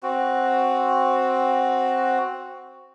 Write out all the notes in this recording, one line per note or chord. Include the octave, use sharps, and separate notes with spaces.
C4 F#4